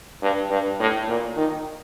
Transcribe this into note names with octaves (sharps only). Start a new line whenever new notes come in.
G2
G2
A2
A#2
D#3